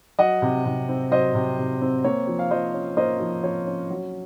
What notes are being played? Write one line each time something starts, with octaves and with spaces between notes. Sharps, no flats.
F#3 D#5 F#5
C3
C3
C4
F#3 C5 D#5
C3
C3
C4
A#3 C#5
F3
F5
F3 C5 D#5
C#4
A#3 C5 D#5
F3
F3 C#5
C#4
F#3